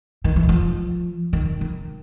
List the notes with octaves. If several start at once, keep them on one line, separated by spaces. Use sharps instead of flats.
D#3
E3
F3
D#3
D#3